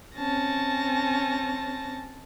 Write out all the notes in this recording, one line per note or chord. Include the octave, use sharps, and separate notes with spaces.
C4 C#4 A5 A#6